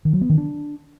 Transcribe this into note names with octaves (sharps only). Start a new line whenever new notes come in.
D#3
F#3
B3
D#3
D4